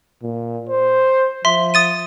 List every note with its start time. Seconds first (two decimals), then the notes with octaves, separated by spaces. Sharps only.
0.23 A#2
0.69 C5
1.45 F3 E5 C6
1.74 D#6 A6 D#7